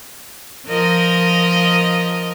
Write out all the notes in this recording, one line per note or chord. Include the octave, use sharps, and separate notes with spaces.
F3 A#4 D#5